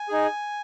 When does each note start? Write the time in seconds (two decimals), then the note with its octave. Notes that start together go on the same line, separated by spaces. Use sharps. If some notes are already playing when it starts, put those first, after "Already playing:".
Already playing: G#5
0.09 D#4 G#4